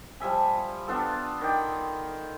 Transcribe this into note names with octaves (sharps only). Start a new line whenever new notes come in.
F3 G3 E5 G#5
B3 D4 F4 A4
D#3 D5 G5